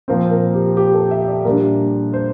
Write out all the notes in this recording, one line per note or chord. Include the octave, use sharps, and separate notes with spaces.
A#2 F3 C4 A#4
A#4
G4
G4
A4
E5
E5
D5
A#2 G3 D4 A#4
C5